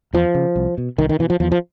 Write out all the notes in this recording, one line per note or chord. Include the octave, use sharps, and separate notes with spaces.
E2 F3
C#3
C2
B2
C2 D#3
D#3
B2 E3
F3
E2 F3
F3